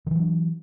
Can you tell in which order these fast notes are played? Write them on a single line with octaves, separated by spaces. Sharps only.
D#3 E3 F#3 D4